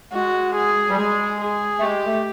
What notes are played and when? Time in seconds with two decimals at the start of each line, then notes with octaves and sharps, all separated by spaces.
0.13 G#3 F#4
0.56 G#4
0.89 G3
0.98 G#3 G#4
1.41 G#4
1.79 A3
1.83 G#3 G4
2.05 A3